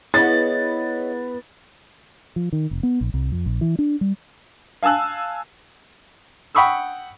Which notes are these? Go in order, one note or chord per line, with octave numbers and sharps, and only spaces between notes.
B3 E4 G#4 C#5 D#5 A6
F3
D#3
F1
B3
A#1
C2
F2
A#1
E3
D4
G3
F5 G#5 A5 E6 F#6
F#5 G5 B5 C#6 D#6 E6